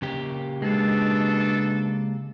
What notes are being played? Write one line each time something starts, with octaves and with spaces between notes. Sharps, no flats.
C#3 A#3 G4
B2 G#3 D4 A4